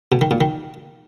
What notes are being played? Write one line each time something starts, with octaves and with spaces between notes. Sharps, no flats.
B2
D#3
A#2
D#3